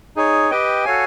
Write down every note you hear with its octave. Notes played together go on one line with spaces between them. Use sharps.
D#4 G#4 C#5
G4 B4 D#5 G5
F#4 A4 C#5 F5 G#5